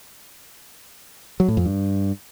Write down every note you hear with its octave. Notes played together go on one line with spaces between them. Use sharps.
F#3
A2
F2
G2